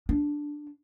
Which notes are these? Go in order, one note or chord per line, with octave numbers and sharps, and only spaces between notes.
D4